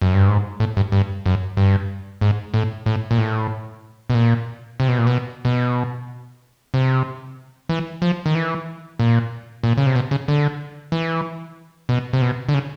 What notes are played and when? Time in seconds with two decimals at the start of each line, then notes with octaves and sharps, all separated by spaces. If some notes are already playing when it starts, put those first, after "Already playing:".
0.02 F#2
0.14 G2
0.28 G#2
0.60 A2
0.77 G2
0.92 G2
1.26 F#2
1.57 G2
2.21 G#2
2.54 A2
2.86 A2
3.11 A#2
3.18 A2
4.10 B2
4.15 A#2
4.80 C3
4.88 B2
4.98 A#2
5.07 B2
5.45 B2
6.74 C3
7.69 E3
8.02 F3
8.26 D#3
8.35 E3
8.99 A#2
9.63 A#2
9.77 C#3
9.86 C3
9.95 B2
10.11 C#3
10.28 D3
10.92 E3
11.89 B2
12.13 C3
12.22 B2
12.49 D3
12.54 C#3